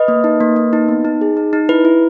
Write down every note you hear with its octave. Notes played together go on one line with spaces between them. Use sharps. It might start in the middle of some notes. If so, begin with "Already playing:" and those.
Already playing: B4 D#5
A#3
D#4
A#3
A#3
D#4
B3
D#4
G#4
D#4
D#4
E4 B4
E4